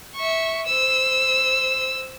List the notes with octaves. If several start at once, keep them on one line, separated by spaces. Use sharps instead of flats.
E5 C#6
C5 E6